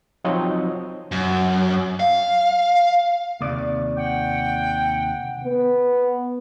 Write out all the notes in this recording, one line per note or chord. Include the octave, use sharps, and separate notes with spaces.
F3 F#3 C4 D#4 C#5 D#5
F#2
F5
D#2 C3 D5
F#5 G5
B3